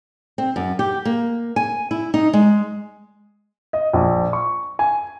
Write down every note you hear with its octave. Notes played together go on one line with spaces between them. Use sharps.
C4
F#2
G4
A#3
G#5
E4
D#4
G#3
D#5
A#1
C#6
G#5